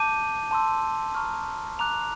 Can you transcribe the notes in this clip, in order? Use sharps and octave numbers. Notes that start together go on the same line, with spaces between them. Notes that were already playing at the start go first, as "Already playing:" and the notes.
Already playing: A5 D6 G6 D#7
A5 C6 E6
A#5 C#6 F6
A#5 D6 F#6 F7